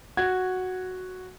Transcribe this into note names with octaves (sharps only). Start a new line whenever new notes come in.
F#4 G#6